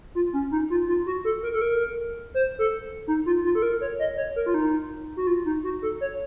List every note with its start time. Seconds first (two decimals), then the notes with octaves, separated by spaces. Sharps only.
0.15 F4
0.33 C#4
0.51 D#4
0.70 F4
0.88 F4
1.06 F#4
1.25 A4
1.43 A#4
1.54 A4
1.61 A#4
2.34 C5
2.59 A4
3.07 D#4
3.26 F4
3.44 F4
3.55 A4
3.62 A#4
3.81 C#5
3.99 D#5
4.17 C#5
4.36 A#4
4.46 F4
4.54 D#4
5.17 F#4
5.27 F4
5.45 D#4
5.64 F#4
5.82 A4
6.01 C#5